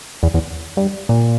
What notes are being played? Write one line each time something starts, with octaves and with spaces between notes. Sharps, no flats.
E2
E2
G2
A#2